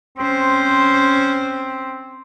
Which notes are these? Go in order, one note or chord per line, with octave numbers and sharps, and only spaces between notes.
C4 C#4 C5